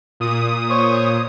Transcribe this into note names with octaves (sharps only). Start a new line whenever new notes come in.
A#2 D#6
C5 C#5 C#6